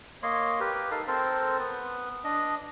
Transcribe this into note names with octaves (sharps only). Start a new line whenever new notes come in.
A#3 C#5 D#5 C6
G4 A#4 B4
D#4 A4 A#4 F5
C4 A4 A#4 C5
B3 B4
D4 D#5